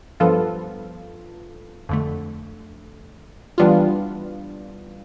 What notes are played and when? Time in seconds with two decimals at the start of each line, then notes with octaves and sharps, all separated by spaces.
0.20 G2 F3 B3 F4 A4
1.89 F2 D3 A3
3.58 E3 G3 B3 D4 F4